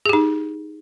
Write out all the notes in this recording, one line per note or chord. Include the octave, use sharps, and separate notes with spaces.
D#4 G4 G#4